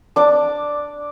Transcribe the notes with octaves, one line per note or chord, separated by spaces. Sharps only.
D4 D5